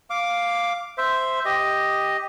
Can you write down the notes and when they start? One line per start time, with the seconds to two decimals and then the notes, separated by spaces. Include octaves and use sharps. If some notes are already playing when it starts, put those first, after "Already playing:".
0.10 F5 D6
0.98 C5 E5
1.45 G4 D#5